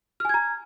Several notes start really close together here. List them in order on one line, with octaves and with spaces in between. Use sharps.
F6 G#5 G#6 A#5